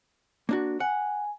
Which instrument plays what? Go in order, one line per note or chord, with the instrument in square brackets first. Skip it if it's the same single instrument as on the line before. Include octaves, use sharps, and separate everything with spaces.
[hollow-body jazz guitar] A#3 D4 F#4
[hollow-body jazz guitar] F#5 [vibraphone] G#5